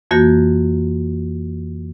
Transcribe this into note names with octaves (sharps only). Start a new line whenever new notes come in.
F2 E3 A#3 F#4 G6 A#6